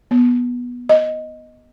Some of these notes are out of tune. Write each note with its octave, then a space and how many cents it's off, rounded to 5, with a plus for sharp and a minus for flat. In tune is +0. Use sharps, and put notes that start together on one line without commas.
B3 -15
D#5 +0